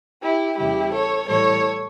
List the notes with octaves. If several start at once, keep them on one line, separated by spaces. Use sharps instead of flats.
E4 G4
E2 C#3 G3 E4 G4
A4 C#5
A2 E3 G3 A4 C#5